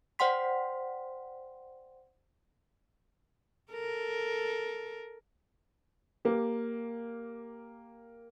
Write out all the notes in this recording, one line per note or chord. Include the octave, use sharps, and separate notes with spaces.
C5 D5 F#5 G5 C6 B6
A4 A#4
A#3 G4